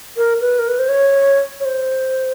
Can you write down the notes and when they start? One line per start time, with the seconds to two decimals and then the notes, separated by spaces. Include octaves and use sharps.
0.17 A#4
0.41 B4
0.59 A#4
0.68 B4
0.79 C5
0.89 C#5
1.60 C#5
1.65 C5